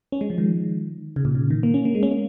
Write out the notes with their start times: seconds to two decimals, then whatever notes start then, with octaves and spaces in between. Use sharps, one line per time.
0.12 C#4
0.21 G#3
0.30 F3
0.38 D#3
1.16 C#3
1.25 A#2
1.35 C#3
1.51 D#3
1.63 A#3
1.74 C#4
1.85 A#3
1.95 G#3
2.03 C#4
2.11 A#3